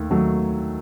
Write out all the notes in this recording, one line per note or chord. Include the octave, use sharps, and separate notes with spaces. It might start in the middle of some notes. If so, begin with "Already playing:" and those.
Already playing: D#2 D#3 A3
D#2 D#3 F#3 A3